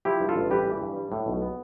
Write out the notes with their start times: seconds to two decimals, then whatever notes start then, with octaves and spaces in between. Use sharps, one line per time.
0.05 F3 E4 G4
0.20 G2
0.29 F4 A4
0.36 A1
0.51 G3 G4 B4
0.66 E3
0.82 G2
0.96 G3
1.12 A2
1.26 B1
1.42 B3